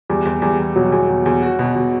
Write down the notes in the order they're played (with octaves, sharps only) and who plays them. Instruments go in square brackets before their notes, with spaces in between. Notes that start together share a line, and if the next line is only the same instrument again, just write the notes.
[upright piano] E2 [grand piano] G3
[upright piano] E2
[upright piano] E2 [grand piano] G3
[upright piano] E2
[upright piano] B2 [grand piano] F#3
[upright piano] E2
E2
E2
F#4
B2
B2